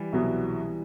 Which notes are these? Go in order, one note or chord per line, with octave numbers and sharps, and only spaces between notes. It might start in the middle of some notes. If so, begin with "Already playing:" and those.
Already playing: E3 G3
C2 B2 F#3 B3